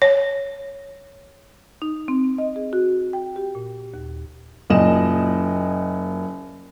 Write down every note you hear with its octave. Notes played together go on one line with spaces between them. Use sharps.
C#5
D#4
C4
D#5
G#4
F#4
G5
G4
A#2
D#2
F#1 A#2 D#5 E7